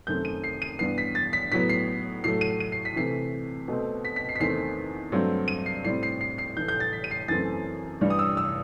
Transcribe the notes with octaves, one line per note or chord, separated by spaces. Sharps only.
F#2 D#3 A3 C4 G6
D#7
C7
D#7
G2 E3 B3 C7
B6
A6
B6
A2 F#3 B3 B6
C7
A2 F#3 A3 C7
D#7
D#7
C7
B6
C3 E3 A3 C7
B2 A3 C4
B6
B6
C7
B6
E2 D#3 A3 C4 C7
G2 F#3 A3 C4
D#7
C7
A2 G3 C4 C7
C7
C7
C7
A2 E3 A3 G6
G6
A6
B6
D#7
C7
F#2 E3 A3 C4 A6
G2 E3 G3
D#6
E6
E6